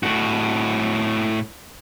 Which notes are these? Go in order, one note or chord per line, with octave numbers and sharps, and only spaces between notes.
A2 F#4